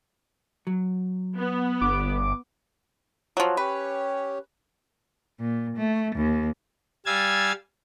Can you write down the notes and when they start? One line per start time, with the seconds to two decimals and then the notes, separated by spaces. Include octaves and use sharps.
0.67 F#3
1.37 B3
1.81 G1 D6
3.37 F3 F#3
3.57 C#4 G4 B4 C#5
5.40 A#2
5.77 A3
6.16 D#2
7.06 G3 F5 G#5 E6 G#6 A6